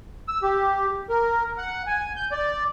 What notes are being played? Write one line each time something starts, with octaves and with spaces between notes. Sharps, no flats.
E6
G4
A#4
F#5
G#5
G6
D5